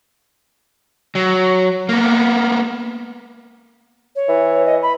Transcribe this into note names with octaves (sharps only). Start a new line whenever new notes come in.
F#3
A#3 B3
C#5
E3
D#5
B5